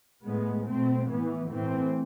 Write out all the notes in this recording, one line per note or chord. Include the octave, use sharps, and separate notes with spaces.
A2 G#3 B3
B2 A3 C4
A2 E3 B3
A2 E3 A3 C4